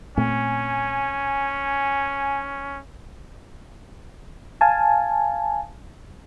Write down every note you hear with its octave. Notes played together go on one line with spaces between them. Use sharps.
A#2 A3 C4 C#4 G#5
F5 G#5 A5